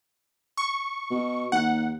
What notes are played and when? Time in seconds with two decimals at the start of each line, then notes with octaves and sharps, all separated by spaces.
0.57 C#6
1.11 B2
1.52 D#2 F#5